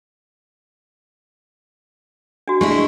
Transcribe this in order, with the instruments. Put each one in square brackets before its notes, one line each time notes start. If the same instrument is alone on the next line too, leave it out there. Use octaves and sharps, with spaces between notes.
[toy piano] D4 F#4
[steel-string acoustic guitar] G#3 D4 E4 [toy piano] G4